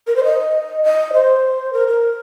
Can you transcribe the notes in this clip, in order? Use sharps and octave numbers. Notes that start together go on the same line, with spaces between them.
A#4
C5
D#5
D#5
C5
A#4
A#4